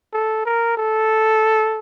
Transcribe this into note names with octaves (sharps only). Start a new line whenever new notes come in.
A4
A#4
A4